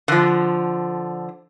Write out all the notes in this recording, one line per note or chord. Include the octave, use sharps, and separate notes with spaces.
D3 F3